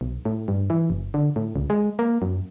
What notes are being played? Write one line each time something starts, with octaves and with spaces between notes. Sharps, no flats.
B1
A2
G2
E3
F#1
D3
A2
C#2
G#3
A#3
F#2